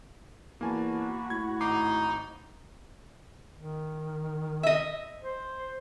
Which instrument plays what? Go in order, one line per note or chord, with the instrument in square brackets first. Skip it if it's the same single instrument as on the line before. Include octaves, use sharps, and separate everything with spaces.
[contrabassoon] E2 [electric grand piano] A#3 G#5 A5 [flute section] F#4 B5 C#6
[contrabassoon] A2 [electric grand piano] G#6
[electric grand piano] G#1 D6 C7 [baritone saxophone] D#4
[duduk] D#3
[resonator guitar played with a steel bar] D#5 E5
[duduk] C5